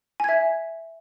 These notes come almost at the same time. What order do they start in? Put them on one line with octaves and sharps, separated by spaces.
G#5 G#6 E5